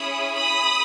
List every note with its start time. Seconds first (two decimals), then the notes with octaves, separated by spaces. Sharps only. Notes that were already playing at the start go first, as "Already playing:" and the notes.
Already playing: C#4 E4 G#4 B5 D#6
0.35 B5 D#6